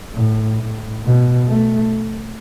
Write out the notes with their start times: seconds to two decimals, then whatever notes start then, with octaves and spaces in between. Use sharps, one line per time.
0.14 A2
0.59 A2
1.04 B2
1.48 A3